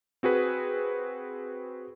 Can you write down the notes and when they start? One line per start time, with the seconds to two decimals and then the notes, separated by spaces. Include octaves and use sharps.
0.23 C4 F#4 G#4 B4